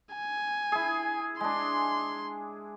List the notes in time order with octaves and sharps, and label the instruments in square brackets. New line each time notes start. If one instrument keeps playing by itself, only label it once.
[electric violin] G#5
[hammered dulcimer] E4 G#4
[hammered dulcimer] G#3 D4 [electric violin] C6